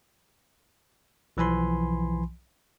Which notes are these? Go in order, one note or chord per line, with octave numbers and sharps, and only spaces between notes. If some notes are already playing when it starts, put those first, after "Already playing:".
B1 E3 F3 G#5 B5 C6